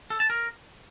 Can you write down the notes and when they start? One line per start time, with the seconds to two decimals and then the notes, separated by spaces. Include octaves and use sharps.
0.10 A4
0.20 A5
0.30 A#4